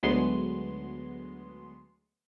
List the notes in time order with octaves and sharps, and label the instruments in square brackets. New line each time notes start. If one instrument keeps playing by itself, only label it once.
[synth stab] D2 F#3 G#3 B3 C6